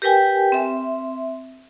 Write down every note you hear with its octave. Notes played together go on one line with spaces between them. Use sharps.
G4 A#4 B4 G5 G#5
C4 E5